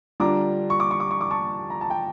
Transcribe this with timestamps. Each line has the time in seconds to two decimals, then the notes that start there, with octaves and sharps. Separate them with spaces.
0.20 D3 G3 D4 F4 A#5 D6
0.70 C#6
0.80 D6
0.91 C#6
1.00 D6
1.11 C#6
1.21 D6
1.31 A5 C#6
1.70 A#5
1.81 A5
1.90 G5